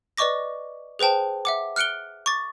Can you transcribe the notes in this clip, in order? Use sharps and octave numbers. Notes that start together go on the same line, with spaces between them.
B4 D5 D#5 C#6 D6 A#6
G#4 B4 C5 G5 A5
E5 F#5 D6
F6 F#6 C#7 D7 G7
C#6 D6 A6